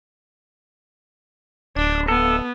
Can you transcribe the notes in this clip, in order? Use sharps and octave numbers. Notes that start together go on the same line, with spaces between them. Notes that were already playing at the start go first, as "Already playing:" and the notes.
D1 D4
B3 A4